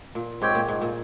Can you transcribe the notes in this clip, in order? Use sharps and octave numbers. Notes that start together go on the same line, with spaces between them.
A#2
G#2 C4 G4 C#5 G5
A#2
G#2
A#2